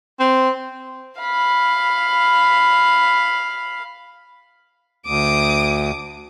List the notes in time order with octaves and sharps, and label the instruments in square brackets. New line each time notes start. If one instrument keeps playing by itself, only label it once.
[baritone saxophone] C4
[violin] F5 B5
[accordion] D2 [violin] D6 D#6